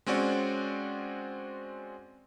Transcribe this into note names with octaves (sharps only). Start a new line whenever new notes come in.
G#3 C4 C#4 F#4 D5